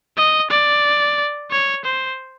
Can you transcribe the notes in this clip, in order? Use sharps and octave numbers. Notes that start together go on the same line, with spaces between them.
D#5
D5
C#5
C5